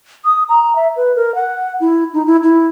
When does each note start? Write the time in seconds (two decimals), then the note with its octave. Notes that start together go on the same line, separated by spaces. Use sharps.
0.25 D#6
0.49 A#5
0.76 E5
0.96 B4
1.16 A#4
1.35 F#5
1.80 E4
2.14 D#4
2.26 E4
2.43 E4